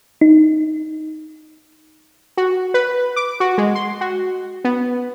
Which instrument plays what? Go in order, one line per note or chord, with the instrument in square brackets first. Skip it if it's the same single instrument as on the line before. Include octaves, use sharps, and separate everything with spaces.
[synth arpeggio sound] D#4
[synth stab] F#4
B4
D6
F#4
G#3
C6
F#4
B3